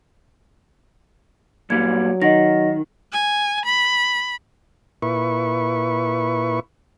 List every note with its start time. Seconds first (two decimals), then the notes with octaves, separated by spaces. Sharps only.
1.70 G2 A#2 F#3 G3 G#6
2.22 D#3 D#5 F#5 A#6
3.13 G#5
3.66 B5
5.02 A#2 E4 B4 C#6